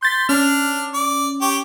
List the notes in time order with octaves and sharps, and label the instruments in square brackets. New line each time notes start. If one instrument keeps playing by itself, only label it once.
[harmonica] C6 [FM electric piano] G6 A6 B6
[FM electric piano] C#4 [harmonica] D4 F6
[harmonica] D5
G4 C#5